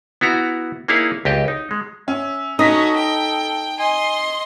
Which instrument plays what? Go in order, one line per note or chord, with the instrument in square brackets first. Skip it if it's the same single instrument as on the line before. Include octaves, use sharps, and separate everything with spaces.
[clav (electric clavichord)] B3 E4 F#4 A#5
A#3 D#4 E4 G#4 C#5 F5
C#2 G4 D#5
D#4
G#3
[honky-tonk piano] C#4 [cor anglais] E5
[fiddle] C#4 F#4 [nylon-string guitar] D#4 [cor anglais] A4 [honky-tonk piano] D#6 A#6 B6
[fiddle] G5
[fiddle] D#5 C6 [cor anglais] G#5